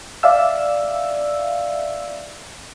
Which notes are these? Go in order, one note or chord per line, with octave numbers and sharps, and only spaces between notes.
D5 E5 F5 E6